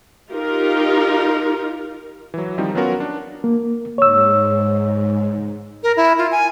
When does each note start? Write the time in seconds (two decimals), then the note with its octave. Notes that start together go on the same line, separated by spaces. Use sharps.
0.30 D#4 F4 G4 A#4
2.34 E3 F#3
2.58 D#3 F3 G3 C4 D#4
2.75 F#3 B3 C#4 F4 F#4 A#4
3.00 D4
3.44 A#3
3.98 G#2 C#5 E6
5.83 A#4
5.97 E4
6.18 F4
6.31 G#5